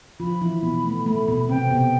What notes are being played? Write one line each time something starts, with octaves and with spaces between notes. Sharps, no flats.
F3 F4 B5
E3 E4
B2 B3
A3
A3
B2 B3
C3 C4 G5
B2 B3